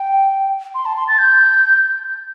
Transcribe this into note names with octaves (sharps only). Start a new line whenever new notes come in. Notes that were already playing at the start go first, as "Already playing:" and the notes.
Already playing: G5
C6
A5
C6
A6
G6